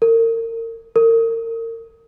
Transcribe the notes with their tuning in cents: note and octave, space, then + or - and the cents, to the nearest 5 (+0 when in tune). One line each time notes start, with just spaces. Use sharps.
A#4 -35
A#4 -35